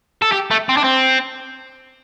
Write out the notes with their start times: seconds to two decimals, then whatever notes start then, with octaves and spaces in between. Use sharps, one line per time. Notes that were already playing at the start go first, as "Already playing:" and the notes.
0.22 A4
0.32 G4
0.51 A3
0.69 C4
0.77 D4
0.84 C4